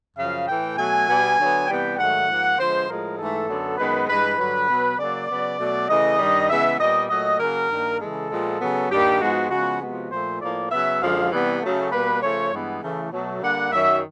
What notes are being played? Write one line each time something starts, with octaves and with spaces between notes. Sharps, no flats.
F#2 C#3 F3 F5
A2 E3 A3 G5
B2 F#3 A3 G#5
B2 G3 B3
D3 F#3 B3
C3 E3 G3 B3 G5
G#2 D#3 F#3 A3 F#5
G#2 F3 A#3
D3 F3 G#3 B3 C5
A2 F3 G#3 A#4
G#2 E3 A3 A4
F#2 D3 F#3 B3
F#2 D#3 G#3 B3 B4
G2 E3 G#3 B4
G2 D3 F#3 B4
B2 F#3 B3
C#3 F#3 A#3 D5
C#3 F#3 B3
B2 F#3 A3
C#3 E3 A3 D#5
G2 D#3 G3
C#3 E3 G#3 B3 E5
A#2 G3 B3 D#5
A#2 F#3 A3 D#5
C#3 F#3 A#3 A#4
G2 D#3 G3 A#3
C#3 E3 G#3 A4
A#2 F3 G#3 B3
C#3 F#3 B3
G2 D#3 G3 A#3 G4
G#2 F3 G#3 B3 F#4
C#3 F3 G#3 B3 F#4
C3 F3 G#3 B3 F#4
A#2 F3 A3 C5
A2 F3 A#3 D5
C#3 F#3 B3 E5
F#2 D3 F3 G#3 F5
C3 E3 G3 B3
C#3 F#3 A3
B2 G3 A#3 B4
C#3 F3 A3 C#5
G2 E3 G#3 B3
C#3 E3 A3
B2 F#3 A3
D3 G3 A#3 F#5
F#2 D#3 F#3 E5